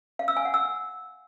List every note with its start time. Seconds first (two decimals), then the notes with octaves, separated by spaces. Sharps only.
0.19 F5
0.28 E6
0.37 G#5
0.45 F#5
0.54 E6